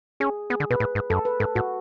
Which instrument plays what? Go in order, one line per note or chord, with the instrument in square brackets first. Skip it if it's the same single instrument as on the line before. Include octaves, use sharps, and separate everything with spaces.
[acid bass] C#4 [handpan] G#4
[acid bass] B3 [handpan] G#4
[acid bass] D3
[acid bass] B2 [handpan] B4
[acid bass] A2
G#2
[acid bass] F#2 [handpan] A4
[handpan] B4
[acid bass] G#2 [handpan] A4
[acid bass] A2 [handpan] F#4